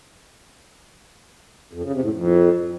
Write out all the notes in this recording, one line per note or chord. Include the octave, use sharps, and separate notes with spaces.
F2
C#3
C3
A2
F2